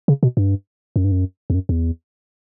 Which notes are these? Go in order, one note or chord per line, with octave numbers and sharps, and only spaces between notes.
C#3
B2
G2
F#2
G2
F#2
E2
F#2
E2